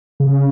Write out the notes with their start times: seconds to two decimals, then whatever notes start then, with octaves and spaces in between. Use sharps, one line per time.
0.20 C#3